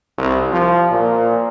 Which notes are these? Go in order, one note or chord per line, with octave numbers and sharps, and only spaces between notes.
C2
F3
A#2